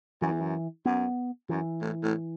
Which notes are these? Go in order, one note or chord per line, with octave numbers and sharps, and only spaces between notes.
F#2 E3
E2
F#2
F#2 B3
F#2 E3
A2
A2